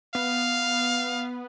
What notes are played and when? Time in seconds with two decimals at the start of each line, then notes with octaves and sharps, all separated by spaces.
0.15 B3 F5